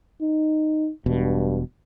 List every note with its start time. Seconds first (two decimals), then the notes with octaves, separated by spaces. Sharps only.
0.22 D#4
1.06 E1 G2 B2